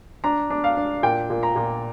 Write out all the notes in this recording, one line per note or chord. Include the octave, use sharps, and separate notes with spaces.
D4 A#5
D4
F5
D4
A#2 G5
A#2
A#5
A#2